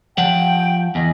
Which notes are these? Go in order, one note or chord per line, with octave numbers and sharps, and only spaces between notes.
F3 F#5 G5
E2 D#5 G#5